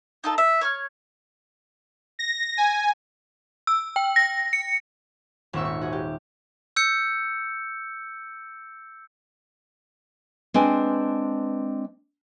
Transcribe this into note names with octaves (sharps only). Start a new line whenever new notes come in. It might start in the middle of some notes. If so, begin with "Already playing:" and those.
D#4 F4 A4
E5
C#5 C#6 F6
A#6
G#5
E6
G5
A#6
C#7
D#1 G#1 C4 E5 C#6 E6
C#6
F#4 G#4
G4
E6 G6 C#7
G#3 C4 D4 B4 G#5